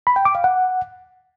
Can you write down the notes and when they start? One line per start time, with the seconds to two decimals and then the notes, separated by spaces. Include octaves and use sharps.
0.07 B5
0.16 G5
0.25 D6
0.35 F5
0.44 F#5